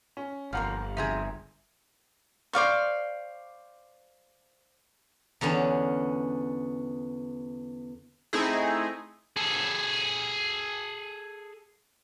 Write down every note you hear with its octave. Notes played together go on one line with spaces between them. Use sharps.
C#4
G1 A#2 F3 A#3 F5 F#5 A#5 F6
D2 F3 C4 G#4 E5 A#5
C5 D5 F5 C#6
E2 D3 B3 C#4
A3 C4 D#4 E4 G#4
G#4 A4